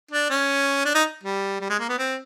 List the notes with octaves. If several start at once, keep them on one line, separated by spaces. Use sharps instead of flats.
D4
C#4
D4
D#4
G3
G3
G#3
A#3
B3
C4